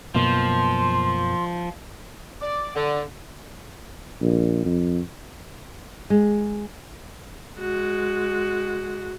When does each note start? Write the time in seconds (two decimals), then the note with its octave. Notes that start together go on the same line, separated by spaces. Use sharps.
0.15 F#2 B2 F3 A#3 C6
2.42 D5
2.75 D3
4.21 A#1
4.65 F2
6.10 G#3
7.57 G#3 F#4